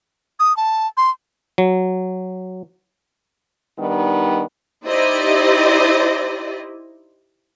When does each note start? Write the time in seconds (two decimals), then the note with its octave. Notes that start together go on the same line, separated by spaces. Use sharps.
0.40 D#6
0.57 A5
0.97 C6
1.58 F#3
3.79 D#3 G3 B3 D4 D#4
4.85 D#4 E4 G4 C5 D5 D#5